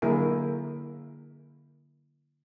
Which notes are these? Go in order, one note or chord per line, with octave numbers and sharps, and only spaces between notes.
D3 F#3 A#3 E4 G#4 A#4